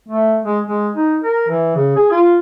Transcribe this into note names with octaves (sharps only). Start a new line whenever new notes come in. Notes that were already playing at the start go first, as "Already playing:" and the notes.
A3
G#3
G#3
D#4
A#4
E3
C#3
G#4
F4